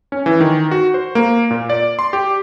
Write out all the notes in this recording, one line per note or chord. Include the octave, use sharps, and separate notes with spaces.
C#4
E3
D#3
F#4
C5
A#3
A#2
D5
C6
G4